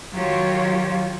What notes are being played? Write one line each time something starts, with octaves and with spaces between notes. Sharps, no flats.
D#3 F#3 F4 G4 C#5